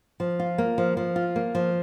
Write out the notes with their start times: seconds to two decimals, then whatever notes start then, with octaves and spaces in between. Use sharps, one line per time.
0.20 F3
0.39 F4
0.58 A#3
0.78 F3
0.97 F3
1.16 F4
1.36 A#3
1.55 F3